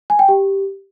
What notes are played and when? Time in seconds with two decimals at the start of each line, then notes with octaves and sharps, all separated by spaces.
0.10 G#5
0.19 G5
0.28 G4